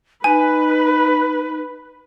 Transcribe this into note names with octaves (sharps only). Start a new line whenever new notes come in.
D#4 B4 G#5